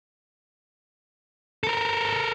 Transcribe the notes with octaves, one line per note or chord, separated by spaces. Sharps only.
A4 A#4